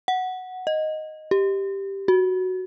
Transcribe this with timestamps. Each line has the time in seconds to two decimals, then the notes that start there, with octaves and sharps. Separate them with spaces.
0.08 F#5
0.67 D#5
1.31 G4
2.08 F#4